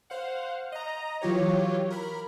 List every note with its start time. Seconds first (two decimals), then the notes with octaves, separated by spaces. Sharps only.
0.10 C5 F5 F#5
0.72 D#5 A#5
1.22 E3 F#3 F4 G4 C#5
1.90 A#4 B5